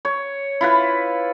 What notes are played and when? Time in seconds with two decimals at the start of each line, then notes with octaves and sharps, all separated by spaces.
0.05 C#5
0.61 E4 F4 B4